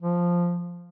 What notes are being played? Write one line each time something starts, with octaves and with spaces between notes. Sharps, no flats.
F3